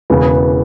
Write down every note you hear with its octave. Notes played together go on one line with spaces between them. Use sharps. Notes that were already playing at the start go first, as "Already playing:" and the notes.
E1 E2 C#3 B3